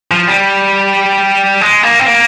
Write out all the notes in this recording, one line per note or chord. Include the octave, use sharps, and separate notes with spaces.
F3
G3
G#3
A#3
C4
A#3